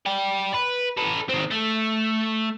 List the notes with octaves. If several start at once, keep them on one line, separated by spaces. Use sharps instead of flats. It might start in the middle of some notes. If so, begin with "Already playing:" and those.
D5 G5
B4
A4 B4
D#3 C4
A3